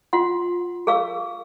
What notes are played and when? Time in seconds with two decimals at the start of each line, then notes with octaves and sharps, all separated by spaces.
0.13 F4 F#5 C6
0.87 G#4 A#4 F5 C#6 E6